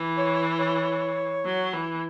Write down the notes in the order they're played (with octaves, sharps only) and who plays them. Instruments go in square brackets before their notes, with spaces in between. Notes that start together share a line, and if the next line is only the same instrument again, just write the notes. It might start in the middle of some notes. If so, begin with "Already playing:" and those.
Already playing: [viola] E3
[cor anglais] C#5
C#5
[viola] F#3
E3